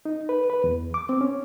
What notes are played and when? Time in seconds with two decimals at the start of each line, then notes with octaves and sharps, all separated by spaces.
0.05 D#4
0.29 B4
0.50 B4
0.64 E2
0.94 D6
1.09 C4
1.21 C#4